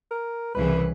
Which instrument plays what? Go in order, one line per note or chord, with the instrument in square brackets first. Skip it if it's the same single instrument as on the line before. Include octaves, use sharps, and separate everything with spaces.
[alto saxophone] A#4
[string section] C2 C#3 E3 [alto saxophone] B4